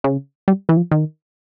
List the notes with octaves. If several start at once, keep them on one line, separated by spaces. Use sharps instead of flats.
C#3
G3
E3
F3
D#3